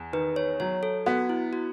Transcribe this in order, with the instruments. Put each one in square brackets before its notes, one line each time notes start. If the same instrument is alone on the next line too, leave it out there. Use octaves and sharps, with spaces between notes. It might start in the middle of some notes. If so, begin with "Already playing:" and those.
Already playing: [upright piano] E2
[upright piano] D#3 [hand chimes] B4
[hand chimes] C#5
[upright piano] F#3 [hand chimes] C#5
[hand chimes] A4
[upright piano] B3 [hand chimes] F#4
[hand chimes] E4
F#4